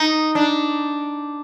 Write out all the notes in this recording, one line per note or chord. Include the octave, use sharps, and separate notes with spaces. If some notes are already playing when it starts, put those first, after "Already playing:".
Already playing: D#4
D4